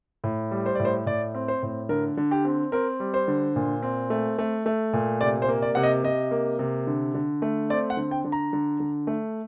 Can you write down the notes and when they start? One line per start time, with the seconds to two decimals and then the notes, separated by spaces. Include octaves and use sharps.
0.24 A2
0.51 G3
0.66 C5
0.75 A2 D5
0.85 C5
1.06 A2 D5
1.34 C4
1.48 C5
1.63 A2
1.89 D3 A#4
2.17 D3
2.31 G4
2.45 C4
2.72 C4 A#4
3.00 G3
3.14 C5
3.28 D3
3.56 A#2
3.83 C4
4.10 A3
4.38 A3
4.66 A3
4.93 A#2
5.21 C3 D5
5.42 C5
5.49 A#3
5.62 D5
5.75 C3 F#5
5.83 D#5
6.04 C3 D#5
6.31 A#3
6.59 C3
6.87 D3
7.14 D3
7.42 A3
7.70 C4 D5
7.90 F#5
7.97 D3
8.11 G5
8.25 D3
8.32 A#5
8.53 D3
8.80 D3
9.07 A3